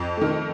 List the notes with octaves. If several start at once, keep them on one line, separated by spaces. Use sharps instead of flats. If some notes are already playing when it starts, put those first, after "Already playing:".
Already playing: F2 A5
D#3 A3